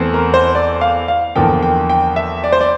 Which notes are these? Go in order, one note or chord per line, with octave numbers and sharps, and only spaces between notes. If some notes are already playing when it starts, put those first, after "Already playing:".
Already playing: E2 E3 A3 C4
A#4
C5
D5
F5
F5
E2 D3 F3 A#3 G5
G5
G5
E5
D5
C5
D5